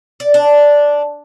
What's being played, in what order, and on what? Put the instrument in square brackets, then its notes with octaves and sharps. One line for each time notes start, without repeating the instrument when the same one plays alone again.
[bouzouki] D5
D4